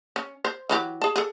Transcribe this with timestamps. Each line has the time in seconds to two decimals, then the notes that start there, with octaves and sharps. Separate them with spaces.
0.16 C#4
0.45 C5
0.69 E3 F#3 G4
1.02 G#4 A5
1.16 G#4 A4